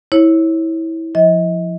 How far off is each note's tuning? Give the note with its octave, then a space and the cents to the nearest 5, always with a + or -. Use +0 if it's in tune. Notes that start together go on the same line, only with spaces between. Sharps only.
E4 -20 C#5 -20
F3 +5 D#5 +35